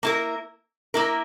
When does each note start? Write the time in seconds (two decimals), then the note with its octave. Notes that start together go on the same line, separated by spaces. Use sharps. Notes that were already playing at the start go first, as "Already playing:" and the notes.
0.03 A#3 E4 A#4
0.94 A#3 E4 A#4